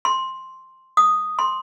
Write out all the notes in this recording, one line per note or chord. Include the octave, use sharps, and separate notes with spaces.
C6
D#6
C6